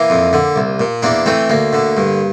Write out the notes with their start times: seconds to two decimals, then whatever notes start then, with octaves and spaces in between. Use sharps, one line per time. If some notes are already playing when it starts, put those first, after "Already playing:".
Already playing: E3 A#3
0.10 F2
0.33 D3
0.56 C2
0.80 A#2
1.02 E2 A#3 D4
1.26 E3 A3 C4
1.50 D2 A#3
1.73 D3
1.97 G2